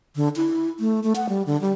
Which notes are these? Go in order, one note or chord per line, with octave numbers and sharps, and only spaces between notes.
D3
E4
A3
A3
F#5
G3
D3
G3